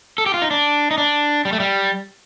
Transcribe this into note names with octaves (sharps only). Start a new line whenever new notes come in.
A4
G4
F4
D#4
D4
D#4
D4
G3
A3
G3